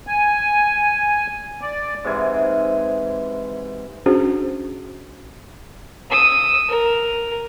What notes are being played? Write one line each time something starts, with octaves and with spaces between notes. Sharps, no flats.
G#5
D5
G#2 C3 E3 G#5
C#4 D4 F#4 G#4 C5
D#6 E6
A#4